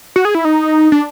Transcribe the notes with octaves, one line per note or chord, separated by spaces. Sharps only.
F#4
G#4
E4
D#4
D4